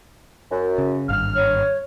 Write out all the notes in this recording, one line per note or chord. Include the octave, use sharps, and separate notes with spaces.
F#2
C#3
G#1 G2 F6
C#5